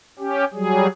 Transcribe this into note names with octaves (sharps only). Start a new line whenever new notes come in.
C#4 G4
F#3 G3 G#4